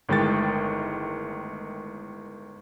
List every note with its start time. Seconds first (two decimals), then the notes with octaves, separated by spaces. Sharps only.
0.09 G1 A2 D#3 G#3 G5 A6